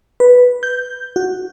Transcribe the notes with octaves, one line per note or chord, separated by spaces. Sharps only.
B4
G6
F#4